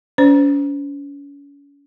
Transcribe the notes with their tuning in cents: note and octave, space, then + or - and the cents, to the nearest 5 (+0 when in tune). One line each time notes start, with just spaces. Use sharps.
C#4 +35 C5 -35